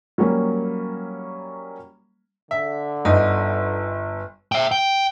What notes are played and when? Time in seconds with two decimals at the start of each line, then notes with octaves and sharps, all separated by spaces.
0.18 F#3 G3 A#3 C#4
2.51 D3 E5
3.05 G1 D#4
4.52 E5 G5
4.71 G5